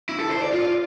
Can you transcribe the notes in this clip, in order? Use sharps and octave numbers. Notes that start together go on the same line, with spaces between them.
E4
A4
C5
D5
F4